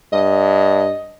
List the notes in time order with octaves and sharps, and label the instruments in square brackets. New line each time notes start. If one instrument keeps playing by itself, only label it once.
[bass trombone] G2 [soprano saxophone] D#5